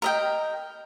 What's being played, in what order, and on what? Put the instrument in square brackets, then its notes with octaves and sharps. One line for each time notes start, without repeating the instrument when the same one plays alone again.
[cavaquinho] A#4 D#5 G5